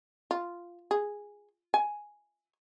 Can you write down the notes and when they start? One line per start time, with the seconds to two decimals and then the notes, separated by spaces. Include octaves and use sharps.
0.31 F4
0.91 G#4
1.74 G#5